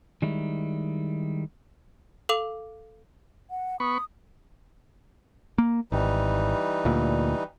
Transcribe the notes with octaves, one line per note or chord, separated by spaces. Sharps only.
D#3 G3 G#3 D#4 E4
A4 F5 D6 F7 F#7
F#5
B3 B5 C#6 D#6
A#3
G#1 E3 G3 D#4
D2 A#2